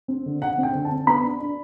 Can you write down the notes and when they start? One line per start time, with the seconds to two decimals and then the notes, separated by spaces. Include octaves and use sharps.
0.08 C4
0.26 D3
0.42 D3 F#5
0.58 C4 G5
0.75 D3
0.85 A5
0.91 C4
1.07 B3 B5
1.23 D4
1.40 D4